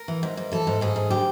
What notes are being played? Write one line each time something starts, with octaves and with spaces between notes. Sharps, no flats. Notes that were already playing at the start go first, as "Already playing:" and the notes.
Already playing: A#4
E3
G#2
G#2
E3 A4
G#2
G#2 G#4
G#2
D3 G4